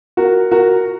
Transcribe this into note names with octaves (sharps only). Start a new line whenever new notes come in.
F#4 A#4
F#4 A#4